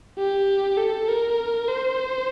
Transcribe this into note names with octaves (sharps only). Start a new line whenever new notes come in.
G4
A4
A#4
C5